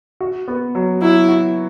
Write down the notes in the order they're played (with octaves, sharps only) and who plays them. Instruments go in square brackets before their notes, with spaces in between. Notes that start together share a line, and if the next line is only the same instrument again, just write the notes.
[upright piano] F#4
B3
F#3
[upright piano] F#3 [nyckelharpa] E4
[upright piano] F#4